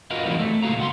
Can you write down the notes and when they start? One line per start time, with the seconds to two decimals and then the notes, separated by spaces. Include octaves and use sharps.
0.11 F4 F#4 A#4 B4 D#5 F5
0.26 E3 F#3 G3 A3 C4 D#4
0.39 A3
0.63 C#2 A#2 D#4 F#4 F5 A#5
0.79 C#2 F#5 B5 C6